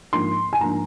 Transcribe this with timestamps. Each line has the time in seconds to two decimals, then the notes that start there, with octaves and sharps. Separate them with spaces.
0.13 G#2 F3 A#3 D4 C6
0.53 G#5
0.61 G#2 F3 A#3 D4 A#5